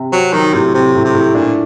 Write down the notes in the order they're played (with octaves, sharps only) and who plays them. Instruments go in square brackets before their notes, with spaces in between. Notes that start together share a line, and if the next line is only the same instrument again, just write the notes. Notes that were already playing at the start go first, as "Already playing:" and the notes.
Already playing: [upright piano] C3
[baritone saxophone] F#3 [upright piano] C4
[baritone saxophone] D#3 [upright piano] F#3
[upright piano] A2 [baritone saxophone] C3
[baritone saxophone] C3 [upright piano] C4
[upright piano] A2
[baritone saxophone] C3
[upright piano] A2
[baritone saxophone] A#2 [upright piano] D4